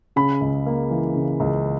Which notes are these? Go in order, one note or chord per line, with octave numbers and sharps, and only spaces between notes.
C#3 B5
C#2
A#3
E3
C#3
C#2